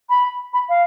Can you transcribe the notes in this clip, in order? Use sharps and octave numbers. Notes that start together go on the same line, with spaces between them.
B5
B5
F5